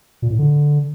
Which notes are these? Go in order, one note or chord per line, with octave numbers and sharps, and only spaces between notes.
A#2
A2
D3